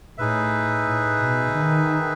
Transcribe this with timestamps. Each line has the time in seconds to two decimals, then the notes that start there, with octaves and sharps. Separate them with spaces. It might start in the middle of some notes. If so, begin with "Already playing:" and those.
0.18 A2 D#4 G#4 B4 E5
0.86 A2
1.21 B2
1.54 D#3